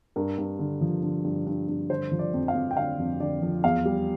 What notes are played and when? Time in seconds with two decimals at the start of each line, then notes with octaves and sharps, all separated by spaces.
0.16 G2 A#4
0.38 G2
0.59 D3
0.81 F3
1.03 D3
1.25 G2
1.46 G2
1.68 G2
1.90 D3 C5
2.12 F3
2.19 D5
2.33 F2
2.48 F5
2.55 F2
2.71 G5
2.77 D3 F5
2.98 F2
3.20 D3 D5
3.42 F3
3.64 E2 F5
3.86 G3